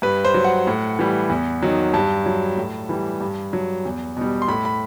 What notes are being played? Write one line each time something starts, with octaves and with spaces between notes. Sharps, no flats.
G2 B4
C5
F#3
F#5
A2
E3 G3
E2
D#3 F#3
G2 A5
F#3
A2
E3 G3
G2
F#3
E2
B2 G3
C6
A2 B5
B5